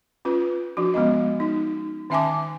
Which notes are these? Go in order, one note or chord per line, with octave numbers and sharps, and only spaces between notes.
C#4 F4 B4
F3 D4 F#4
G#3 B3 C#4 D#5
D#4
D#3 C#4 E5 G#5 A5 D6